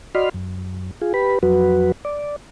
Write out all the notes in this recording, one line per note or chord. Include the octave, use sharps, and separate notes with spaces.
F#4 D5 D#5 B5 C6 F6
F#2
F4 G#4
G4 B4 B5
F2 F#3 F#4 B4
D5